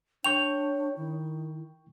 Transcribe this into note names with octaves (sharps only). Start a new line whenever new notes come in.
D4 C#5 G5 C#6 G6 F7
D#3 E4